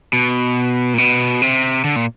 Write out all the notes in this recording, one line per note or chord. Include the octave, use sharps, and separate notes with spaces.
B2
A#2
B2
C3
D3
A#2